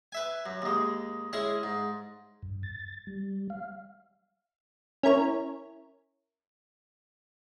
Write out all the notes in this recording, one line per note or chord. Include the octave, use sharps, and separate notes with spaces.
B4 E5 G#5
F#2
D#2 G#3
G#3 C#4 E4 G#4
G#2
G2
A6
G3
F5
C#4 E4 A#4 C#5